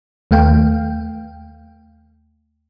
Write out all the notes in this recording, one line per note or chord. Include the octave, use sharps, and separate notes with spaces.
D#2 A3 F5 G5